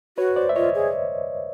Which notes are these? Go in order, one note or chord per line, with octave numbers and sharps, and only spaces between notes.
F#4 B4 C#5
C5 D5
E5
F4 C#5 D#5
G#4